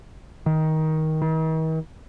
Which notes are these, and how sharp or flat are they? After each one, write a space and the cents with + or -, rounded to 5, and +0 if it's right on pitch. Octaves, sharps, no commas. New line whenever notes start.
D#3 +15
D#3 +45